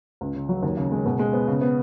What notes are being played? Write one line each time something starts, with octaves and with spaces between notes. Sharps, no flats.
C#2
C#3
F#3
D#2
C#3
G#3
B2
G#3
B3
C#3
B3